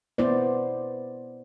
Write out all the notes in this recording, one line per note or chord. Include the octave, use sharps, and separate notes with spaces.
B3 E4 C5 D5